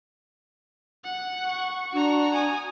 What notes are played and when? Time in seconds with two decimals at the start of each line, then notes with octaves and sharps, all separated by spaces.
1.04 F#5
1.47 C#6
1.93 D4 F#4 A#5
2.33 G#5 D#6